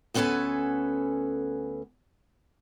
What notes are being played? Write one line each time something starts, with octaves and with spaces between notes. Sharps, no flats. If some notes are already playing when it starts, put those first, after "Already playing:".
D2 B3 C#4 A4 B4 G#5